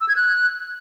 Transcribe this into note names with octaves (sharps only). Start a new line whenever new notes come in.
E6
G#6
F#6